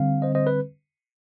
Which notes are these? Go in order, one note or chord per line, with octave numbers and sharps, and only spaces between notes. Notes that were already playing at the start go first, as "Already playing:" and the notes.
Already playing: D3 G3 C4 F5
C5 D#5
C5 D#5
B4